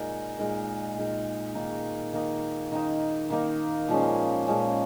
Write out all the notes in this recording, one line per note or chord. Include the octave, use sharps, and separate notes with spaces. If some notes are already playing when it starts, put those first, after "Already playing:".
Already playing: A#2 G#3 D#4 A#4
A#2 G#3 D#4 A#4
A#2 G#3 D#4 A#4
D#3 A#3 D#4
D#3 A#3 D#4
D#3 A#3 D#4
D#3 A#3 D#4
A#2 F3 G#3 C#4
A#2 F3 G#3 C#4